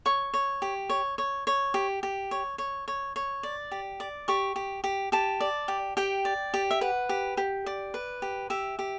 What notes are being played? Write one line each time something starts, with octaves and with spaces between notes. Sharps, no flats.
C#5 C#6
C#5
G4
C#5
C#5
C#5
G4
G4
C#5
C#5
C#5
C#5
D5
G4
D5
G4 C#6
G4
G4
G4 A5
D5
G4
G4 G5
D5
G4
E5
B4 F#5
G4
G4
D5
B4
G4
G4 E5
G4